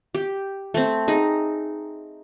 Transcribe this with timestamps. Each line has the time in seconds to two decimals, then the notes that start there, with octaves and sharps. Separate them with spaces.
0.15 G4
0.74 A3 C4
1.08 D#4 G#4